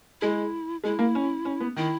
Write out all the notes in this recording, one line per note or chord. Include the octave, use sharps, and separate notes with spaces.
G#3 E4
G#3 E4
A#3
C#4
C#4
B3
D#3 E4